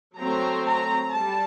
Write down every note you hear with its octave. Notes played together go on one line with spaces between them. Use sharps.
F#3 A3 C4 A#5
A#5
G3 A5